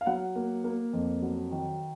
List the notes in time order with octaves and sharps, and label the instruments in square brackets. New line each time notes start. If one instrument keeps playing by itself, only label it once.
[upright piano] F5
F#3 F#5
A#3
A#3
F2
F#3
D#3